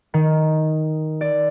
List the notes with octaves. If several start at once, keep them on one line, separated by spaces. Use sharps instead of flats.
D#3
D5